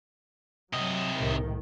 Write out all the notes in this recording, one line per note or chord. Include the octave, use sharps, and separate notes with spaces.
C3 F#3 D#5
C2 A2 D#3